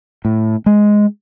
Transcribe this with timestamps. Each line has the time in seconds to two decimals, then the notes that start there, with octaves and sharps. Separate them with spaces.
0.25 A2
0.66 G#3